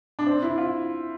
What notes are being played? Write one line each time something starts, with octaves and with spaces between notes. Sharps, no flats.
D4
C4
E4
F4